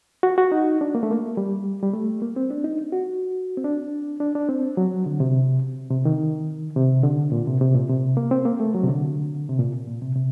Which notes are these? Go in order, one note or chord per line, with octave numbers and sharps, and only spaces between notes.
F#4
F#4
D#4
D4
A#3
A3
A#3
G3
G3
A3
A#3
C4
D4
D#4
F#4
C4
D4
D4
D4
C4
F#3
D3
C3
C3
D#3
C3
D3
A#2
C3
C3
A#2
C3
A#3
C4
A#3
A3
F#3
C3
D3
C3
A#2
A#2
C3
C3